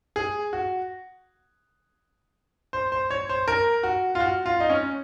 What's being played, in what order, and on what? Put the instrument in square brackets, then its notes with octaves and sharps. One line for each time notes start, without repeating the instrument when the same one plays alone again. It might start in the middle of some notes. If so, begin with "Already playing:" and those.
[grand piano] G#4
F#4
C5
C5
C#5
C5
A#4
F#4
F4
F#4
F4
D#4
C#4